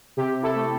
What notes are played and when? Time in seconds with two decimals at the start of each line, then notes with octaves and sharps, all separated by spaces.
0.17 C3 G4
0.42 E4 A4
0.55 A3